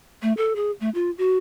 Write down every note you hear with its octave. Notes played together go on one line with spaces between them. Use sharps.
A3
A4
G#4
A3
F4
F#4